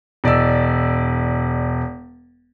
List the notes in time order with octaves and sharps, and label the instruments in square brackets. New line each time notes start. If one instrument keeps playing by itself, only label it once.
[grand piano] E1 D5 D#5 E6